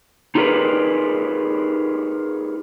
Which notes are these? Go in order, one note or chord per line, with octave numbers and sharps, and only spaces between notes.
D#4 F4 G4 G#4 A#4 B4